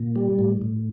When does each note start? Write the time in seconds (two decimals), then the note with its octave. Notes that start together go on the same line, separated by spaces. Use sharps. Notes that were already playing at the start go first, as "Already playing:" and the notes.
Already playing: A#2
0.16 G3
0.39 A2
0.61 A2